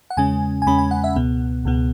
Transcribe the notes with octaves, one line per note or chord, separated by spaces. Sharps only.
F#5
E2 C#3 G#3 C#4 G#5
G#5
E2 C#3 G#3 C#4 B5
G#5
F#5
E5
C#2 B2 B3
C#2 B2 B3